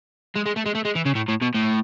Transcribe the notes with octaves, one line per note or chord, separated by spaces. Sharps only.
G#3
G#3
A3
G#3
A3
G#3
E3
C#3
A2
A2
B2
A2